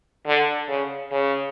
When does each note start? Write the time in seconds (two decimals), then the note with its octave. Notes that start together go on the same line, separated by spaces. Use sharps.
0.26 D3
0.68 C#3
1.11 C#3